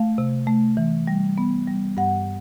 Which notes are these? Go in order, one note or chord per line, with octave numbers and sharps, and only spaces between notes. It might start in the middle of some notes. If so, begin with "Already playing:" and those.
Already playing: A3 F5
C3
A3
E3
G3
B3
G3
G2 F#5